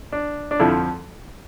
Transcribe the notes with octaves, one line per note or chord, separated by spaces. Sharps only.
D4
D4
F2 D3 F3 E4